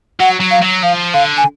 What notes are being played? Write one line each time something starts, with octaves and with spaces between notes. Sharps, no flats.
F#3 F#5
F#3
F5
F#3
F3 F5
D3 F5
G#5